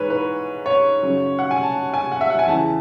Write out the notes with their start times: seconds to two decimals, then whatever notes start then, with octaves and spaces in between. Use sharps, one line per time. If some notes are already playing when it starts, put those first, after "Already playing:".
Already playing: G#2 E3 B4 C#5
0.10 B4
0.66 C#5
1.02 F#2 C#3 F#3
1.39 F#5
1.51 G#5
1.63 A5
1.94 G#5
2.12 F#5
2.21 E5
2.30 F#5
2.39 G#5
2.48 E2 C#3 E3 A5